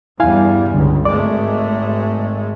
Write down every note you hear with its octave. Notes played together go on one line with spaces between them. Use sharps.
E2 G2 G3 E4 F5 G#5
C#2 D3
G#1 G#3 A3 D5 D6